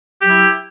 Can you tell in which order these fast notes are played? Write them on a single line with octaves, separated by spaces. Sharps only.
G4 F#3 E4